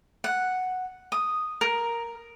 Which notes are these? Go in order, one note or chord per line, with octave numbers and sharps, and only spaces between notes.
F#5
D#6
A#4